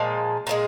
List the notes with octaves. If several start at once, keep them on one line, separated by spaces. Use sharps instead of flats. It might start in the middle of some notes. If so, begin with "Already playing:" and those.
Already playing: A#2 F3 G#3 F5
A#2 F3 G#3